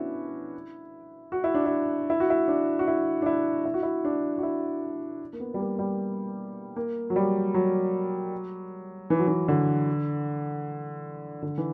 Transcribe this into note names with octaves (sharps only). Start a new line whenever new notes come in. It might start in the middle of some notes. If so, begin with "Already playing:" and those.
Already playing: B3 C#4 D4 E4 F#4
F#4
E4
D4
E4
E4
F#4
E4
D4
F#4
E4
D4
E4
E4
F#4
E4
D4
F#4
E4
A#3
B3
G3
A#3
G3
A#3
F#3
G3
F#3
E3
F#3
E3
D3
D3
E3